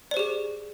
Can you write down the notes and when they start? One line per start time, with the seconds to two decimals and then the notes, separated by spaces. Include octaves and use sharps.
0.11 D5
0.14 C5
0.17 G4
0.19 G#4